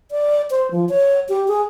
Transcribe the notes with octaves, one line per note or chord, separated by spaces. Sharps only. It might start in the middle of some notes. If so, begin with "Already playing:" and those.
D5
C5
F3
C#5
G4
G#4